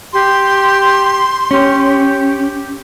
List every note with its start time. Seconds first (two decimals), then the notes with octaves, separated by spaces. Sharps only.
0.13 G4 C6
1.51 C#4 G4